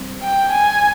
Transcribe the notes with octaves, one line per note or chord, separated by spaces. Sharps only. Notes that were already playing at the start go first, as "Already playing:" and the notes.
Already playing: G3 C4
G5
G#5